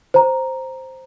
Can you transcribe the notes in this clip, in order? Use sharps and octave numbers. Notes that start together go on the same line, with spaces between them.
C5 A#5